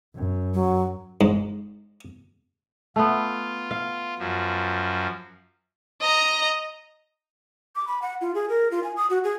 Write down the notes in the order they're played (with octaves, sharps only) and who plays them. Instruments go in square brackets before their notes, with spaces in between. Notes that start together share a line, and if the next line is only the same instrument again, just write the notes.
[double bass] F#2
[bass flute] F#3
[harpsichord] G#2
[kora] A3 B3 [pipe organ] F4
[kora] F5
[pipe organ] F#2 F3
[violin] D#5 A#5
[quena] D6
B5
F#5
F4
G#4
A#4
F4
G#5
D#6
F#4
G#4